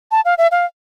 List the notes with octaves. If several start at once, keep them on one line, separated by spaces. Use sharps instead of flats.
A5
F5
E5
F5